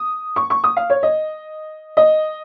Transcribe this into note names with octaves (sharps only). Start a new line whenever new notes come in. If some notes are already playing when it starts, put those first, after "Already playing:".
Already playing: D#6
C#6
C#6
D#6
F5
C#5
D#5
D#5